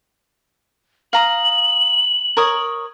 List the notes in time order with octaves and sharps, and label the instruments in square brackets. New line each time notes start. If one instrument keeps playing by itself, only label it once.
[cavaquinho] F5 A#5 D#6 [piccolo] F#7
[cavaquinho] A#4 C#5 D#6